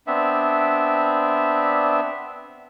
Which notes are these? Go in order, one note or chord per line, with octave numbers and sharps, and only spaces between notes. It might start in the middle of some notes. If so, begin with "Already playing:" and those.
B3 C4 D4 E5